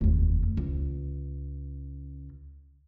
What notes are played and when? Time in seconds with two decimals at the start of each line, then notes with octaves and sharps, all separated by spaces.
0.01 F1 D#2
0.57 C#2